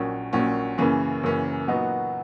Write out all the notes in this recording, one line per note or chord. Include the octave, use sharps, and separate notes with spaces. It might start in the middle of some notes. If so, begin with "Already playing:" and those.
Already playing: A#1 A#2 F#3 C#4
A#1 A#2 F#3 C#4
F#2 C#3 E3 A#3 C#4
F#2 C#3 E3 A#3 C#4
A#2 F#3 B3 D#4 F#4